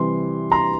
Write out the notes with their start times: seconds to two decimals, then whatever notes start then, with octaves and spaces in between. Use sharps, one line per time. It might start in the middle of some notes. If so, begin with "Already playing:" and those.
Already playing: C3 E3 G3 C6
0.52 A#5 C6